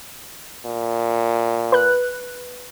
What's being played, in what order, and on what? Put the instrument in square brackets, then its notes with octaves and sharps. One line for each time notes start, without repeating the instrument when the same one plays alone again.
[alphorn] A#2
[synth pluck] B4 F#6